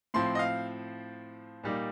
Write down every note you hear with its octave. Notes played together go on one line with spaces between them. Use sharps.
A2 F3 C4 C6
D#5
F5
A#2 G3 A#3 D#4